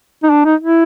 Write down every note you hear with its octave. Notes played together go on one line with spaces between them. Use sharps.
D#4
D4
D#4
E4